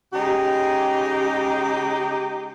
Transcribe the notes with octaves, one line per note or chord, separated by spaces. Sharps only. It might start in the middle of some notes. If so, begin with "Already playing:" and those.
C#3 G#3 D#4 G4